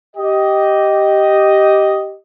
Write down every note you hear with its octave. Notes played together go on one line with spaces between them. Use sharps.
G4 D#5